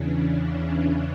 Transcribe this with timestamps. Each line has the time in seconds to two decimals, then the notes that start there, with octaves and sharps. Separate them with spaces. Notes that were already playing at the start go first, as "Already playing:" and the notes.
Already playing: E2 C#3 E3 C#4 D4
0.27 D4